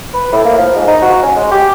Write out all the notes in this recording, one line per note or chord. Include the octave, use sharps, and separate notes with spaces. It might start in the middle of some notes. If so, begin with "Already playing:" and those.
B4
A2
A#3
F3
G#2
D#4
F#4
C#4
G#3
G4